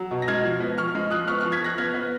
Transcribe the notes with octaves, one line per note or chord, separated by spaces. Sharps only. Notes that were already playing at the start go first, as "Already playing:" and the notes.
Already playing: F#3
B2
A#6
G#3 F6 G#6
F3
B3
F3 C#6 F6
G#3
F3 D#6 F#6
B3 C#6 F6
F3 C#6 F6
G#6 B6
F3 F#6 A#6
B3 F6 G#6
B3